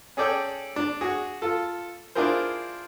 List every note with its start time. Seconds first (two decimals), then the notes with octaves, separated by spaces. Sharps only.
0.17 C#4 G#4 A4 D5 G5
0.76 D4
1.01 F#4 G#4
1.42 F4 A4
2.15 D4 E4 F4 G#4 A#4 C5